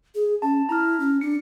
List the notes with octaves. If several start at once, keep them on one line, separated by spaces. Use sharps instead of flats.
G#4
C#4 A5
E4 A#5 F6
C#4
D4 C#7